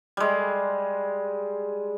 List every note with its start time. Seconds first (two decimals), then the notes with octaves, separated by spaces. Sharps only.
0.17 G3 G#3